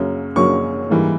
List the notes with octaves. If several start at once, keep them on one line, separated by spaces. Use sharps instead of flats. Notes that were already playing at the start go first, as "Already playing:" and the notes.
Already playing: F#2 C#3 F#3 A#3
F#2 C#3 F#3 A#3 C#6
G#2 E3 G3 A#3